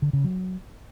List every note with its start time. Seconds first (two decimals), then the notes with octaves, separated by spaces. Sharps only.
0.02 D3
0.13 C#3
0.24 F#3